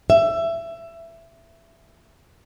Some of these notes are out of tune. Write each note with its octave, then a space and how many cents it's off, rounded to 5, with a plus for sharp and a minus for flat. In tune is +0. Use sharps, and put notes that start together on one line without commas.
E5 +15